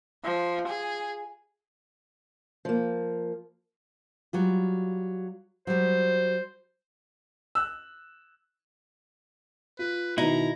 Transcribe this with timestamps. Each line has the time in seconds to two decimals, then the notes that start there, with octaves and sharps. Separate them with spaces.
0.24 F3
0.68 G#4
2.65 F3 A#3
4.33 F#3 G3 F4
5.67 F#3 G3 C5
7.55 E6 F#6
9.79 F4 B4
10.18 B2 D#3 D#4 E4 A#5